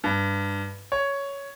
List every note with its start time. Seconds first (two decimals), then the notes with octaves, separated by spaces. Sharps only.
0.04 G2
0.92 C#5